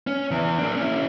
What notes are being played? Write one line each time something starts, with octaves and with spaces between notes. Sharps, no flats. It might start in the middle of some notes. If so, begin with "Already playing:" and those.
C#4
E2 E3
A#3 D4
C#4 E4